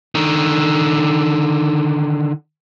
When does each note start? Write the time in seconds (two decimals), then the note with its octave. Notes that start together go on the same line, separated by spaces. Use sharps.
0.15 D3 D#3